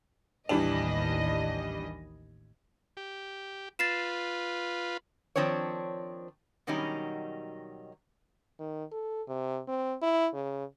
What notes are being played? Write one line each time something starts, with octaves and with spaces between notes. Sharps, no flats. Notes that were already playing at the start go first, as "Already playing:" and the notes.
A1 D#2 E3 G3 D4 D#5
G4
F4 B4 A6 C7 E7
D#3 F3 C4 D4 C#5
B2 D#3 F#3 G3 C#4 D#4
D#3
A4
C3
C4
E4
C#3